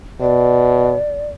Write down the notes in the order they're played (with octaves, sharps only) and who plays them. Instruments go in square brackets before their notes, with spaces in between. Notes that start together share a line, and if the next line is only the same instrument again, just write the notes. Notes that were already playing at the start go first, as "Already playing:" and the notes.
[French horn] B2 [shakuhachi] D5